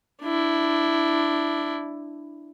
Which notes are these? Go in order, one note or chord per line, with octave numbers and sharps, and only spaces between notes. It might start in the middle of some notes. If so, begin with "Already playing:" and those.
D4 E4